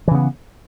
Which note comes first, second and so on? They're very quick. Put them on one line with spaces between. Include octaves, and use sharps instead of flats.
E3 C#3 B3